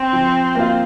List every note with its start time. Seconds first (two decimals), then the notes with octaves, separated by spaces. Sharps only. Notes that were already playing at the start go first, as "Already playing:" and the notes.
Already playing: C4
0.13 F3
0.55 A#3 F4